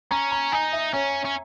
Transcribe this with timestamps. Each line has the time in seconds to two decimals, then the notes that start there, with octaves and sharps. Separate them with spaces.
0.11 C#4 A#5
0.31 A#5
0.52 D#4 G#5
0.73 E5
0.93 C#4 C#5
1.25 C#4